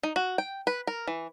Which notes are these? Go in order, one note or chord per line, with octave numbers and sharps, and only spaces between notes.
D#4
F#4
G5
B4
A#4
E3